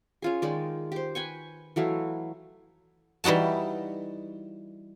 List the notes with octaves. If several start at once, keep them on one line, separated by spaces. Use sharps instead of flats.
C#4 F4 G#4
D#3 G#3 D5
G4 C5
B4 G5 G#5 C#6
E3 F#3 A3 F5
E3 G3 D#4 F#4 A5